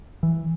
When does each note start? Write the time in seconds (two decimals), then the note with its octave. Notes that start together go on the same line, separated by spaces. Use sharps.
0.23 E3